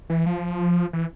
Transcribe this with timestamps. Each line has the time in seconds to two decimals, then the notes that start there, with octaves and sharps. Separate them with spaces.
0.10 E3
0.26 F3
0.93 E3